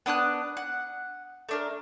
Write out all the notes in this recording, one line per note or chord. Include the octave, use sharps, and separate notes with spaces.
B3 D4 D#6 F#6
F#5
A3 D4 A#4